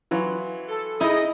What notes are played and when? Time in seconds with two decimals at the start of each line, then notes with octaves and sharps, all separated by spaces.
0.11 E3 F#3 F4
0.69 A4
1.01 D#4 E4 G#4 D#5